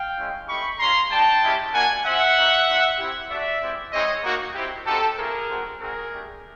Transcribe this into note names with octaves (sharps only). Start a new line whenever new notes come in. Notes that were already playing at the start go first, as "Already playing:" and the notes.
Already playing: F5 G5
G#3 C#4 E4
A3 C4 D#4 G4 B5 C#6
G#3 C#4 F4 A#5 C6
G3 A#3 D#4 G5 A5
G#3 C#4 E4 G4
A#3 D4 F#4 F#5 G#5
C4 F4 E5 F#5
B3 D#4 F#4
A#3 D4 F4
C4 E4 G4
A3 D4 F#4 D5 E5
G#3 C4 E4 G4
G#3 C4 D#4 C#5 D#5
A#3 D#4 F#4
C4 E4 G4
C4 D#4 F#4 G4 A4
A3 C4 F4 G#4 A#4
G#3 C4 D#4 F#4
G#3 C4 D#4 F#4 G#4 A#4
A3 D4 G4